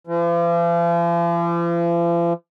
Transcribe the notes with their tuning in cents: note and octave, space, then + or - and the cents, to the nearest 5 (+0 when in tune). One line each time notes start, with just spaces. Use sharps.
F3 -45